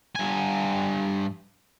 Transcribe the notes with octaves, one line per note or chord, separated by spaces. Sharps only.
G2 G#5